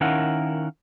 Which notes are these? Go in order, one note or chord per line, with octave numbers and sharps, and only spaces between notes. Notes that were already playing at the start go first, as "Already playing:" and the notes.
D#3 C#4 E4 A#4 F5 F#5